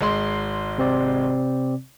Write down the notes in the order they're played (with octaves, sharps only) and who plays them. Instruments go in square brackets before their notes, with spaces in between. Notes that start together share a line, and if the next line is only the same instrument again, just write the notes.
[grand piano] G#1 G#3 C6
[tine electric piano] C3 C4 D5